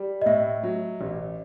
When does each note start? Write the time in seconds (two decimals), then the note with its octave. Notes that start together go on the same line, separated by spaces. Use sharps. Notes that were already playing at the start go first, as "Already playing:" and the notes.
Already playing: G3
0.22 D#5
0.26 A2 E5
0.63 F#3
1.01 A1